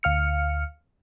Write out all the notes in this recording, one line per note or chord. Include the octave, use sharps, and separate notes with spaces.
D2 F5 F6 C#7